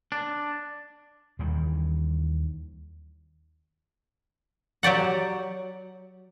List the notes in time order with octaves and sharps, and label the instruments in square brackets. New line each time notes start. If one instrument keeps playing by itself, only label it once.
[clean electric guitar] D4
[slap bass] D#2 D#3 E3 G3
[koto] F#3 G4 D5 F#5